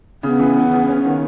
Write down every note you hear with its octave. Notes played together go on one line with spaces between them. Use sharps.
C#3 B3
E3
C#3
C#3
C#4
D#3